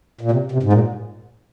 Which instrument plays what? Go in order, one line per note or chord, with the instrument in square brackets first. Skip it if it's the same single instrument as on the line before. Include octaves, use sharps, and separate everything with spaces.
[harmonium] A#2
C3
C3
G#2
A#2